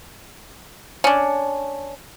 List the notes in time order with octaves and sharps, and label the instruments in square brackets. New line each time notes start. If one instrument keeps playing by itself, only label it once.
[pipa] C#4 D4